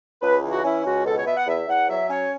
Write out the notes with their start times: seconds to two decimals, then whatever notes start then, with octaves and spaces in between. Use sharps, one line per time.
0.22 C#2 B4
0.43 E3
0.50 F#4
0.64 C#4 E4
0.85 C#2 F#4
1.05 B2 A4
1.17 C#5
1.26 B3 E5
1.37 F#5
1.47 E2 E5
1.68 E2 F#5
1.88 F#3 E5
2.09 C#4 C#5